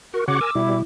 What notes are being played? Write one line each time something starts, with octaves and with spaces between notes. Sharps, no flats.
F#4 A#4
C#3 F#4 C#5 F#5 D6
A#4 G#5 E6
B2 G3 E4
E4